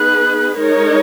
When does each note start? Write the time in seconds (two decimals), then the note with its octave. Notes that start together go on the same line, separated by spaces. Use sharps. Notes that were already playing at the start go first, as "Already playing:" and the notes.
Already playing: B3 D#4 G#4 B4 F#6
0.57 G#3 D#4 A#4 C#5